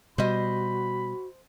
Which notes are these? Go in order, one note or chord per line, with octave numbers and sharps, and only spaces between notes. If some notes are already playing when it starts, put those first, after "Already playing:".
B2 G3 F#4 C5 D#5 B5